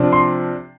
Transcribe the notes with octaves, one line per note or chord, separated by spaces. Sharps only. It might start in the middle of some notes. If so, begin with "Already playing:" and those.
Already playing: C3 F3 D4
C6